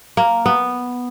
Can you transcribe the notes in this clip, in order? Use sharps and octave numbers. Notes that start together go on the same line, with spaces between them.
A#3
B3